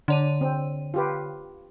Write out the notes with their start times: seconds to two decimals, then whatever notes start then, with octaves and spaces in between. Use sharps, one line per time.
0.08 D3 D4 C#5 D#7
0.41 C4
0.94 F4 G4 B4